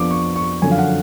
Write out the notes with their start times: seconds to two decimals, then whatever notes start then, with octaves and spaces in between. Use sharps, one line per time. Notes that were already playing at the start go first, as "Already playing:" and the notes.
Already playing: F2 F3 B3 D4 D6
0.11 C#6
0.36 C#6
0.62 F#2 D3 F3 G#5
0.71 F5
0.78 F#5